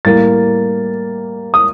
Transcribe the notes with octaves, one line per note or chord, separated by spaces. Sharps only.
A2 G3 A#3 A6
D#6